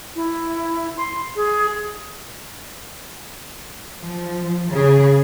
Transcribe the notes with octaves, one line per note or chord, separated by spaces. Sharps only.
E4
C6
G#4
F3
C#3 G#4